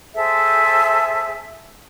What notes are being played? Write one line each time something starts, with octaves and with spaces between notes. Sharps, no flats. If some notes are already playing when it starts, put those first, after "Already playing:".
G#4 A4 C5 E5